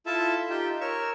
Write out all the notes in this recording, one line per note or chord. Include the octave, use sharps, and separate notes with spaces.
E4 F4 A4 E5 A5
D#4 F4 G4 G5
A#4 C#5 C#6 E6